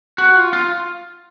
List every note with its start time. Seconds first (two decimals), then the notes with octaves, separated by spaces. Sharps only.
0.18 F#4
0.36 F4
0.53 F4